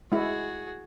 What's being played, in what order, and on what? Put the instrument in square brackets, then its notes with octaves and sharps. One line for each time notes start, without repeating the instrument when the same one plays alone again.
[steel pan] G#3 E4 [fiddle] F#4 G#4